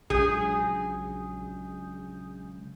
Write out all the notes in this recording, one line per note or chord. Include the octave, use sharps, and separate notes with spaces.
A#1 C#3 F#3 G#3 G#4 D#6 G6